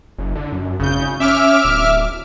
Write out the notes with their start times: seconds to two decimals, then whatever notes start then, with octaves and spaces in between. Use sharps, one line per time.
0.18 F#1
0.35 D3
0.52 F#2
0.80 G#1 C#3 G6
1.20 C#4 E5 D6 F6
1.64 D1